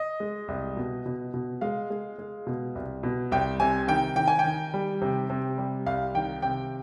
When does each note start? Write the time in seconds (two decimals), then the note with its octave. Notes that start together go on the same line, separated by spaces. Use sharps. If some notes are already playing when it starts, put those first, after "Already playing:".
Already playing: D#5
0.20 G#3
0.48 C2
0.77 B2
1.06 B2
1.34 B2
1.61 G#3 F5
1.90 G#3
2.19 G#3
2.47 B2
2.75 C2
3.03 B2
3.31 C2 G5
3.60 C3 G#5
3.88 D#3 G5
4.16 D#3 G5
4.28 G#5
4.39 G5
4.44 D#3
4.74 G3
5.01 C3
5.30 C3
5.58 G3
5.86 C2 F5
6.15 D#3 G5
6.42 C3 G5